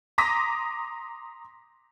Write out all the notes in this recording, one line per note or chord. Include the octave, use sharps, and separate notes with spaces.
A#5 C6 D6 D#6 A#6 B6